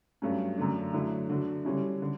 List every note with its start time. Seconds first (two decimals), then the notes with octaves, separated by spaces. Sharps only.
0.22 G2 F#3 A3 C#4
0.57 F#2 D3 A3 D4
0.93 D3 F#3 A3 E4
1.29 D3 A3 D4 F#4
1.65 D3 G3 C#4 E4
2.02 D3